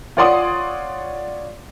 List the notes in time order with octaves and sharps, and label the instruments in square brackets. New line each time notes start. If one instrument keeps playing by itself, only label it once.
[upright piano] F4 C#5 D5 F#5 C6 D#6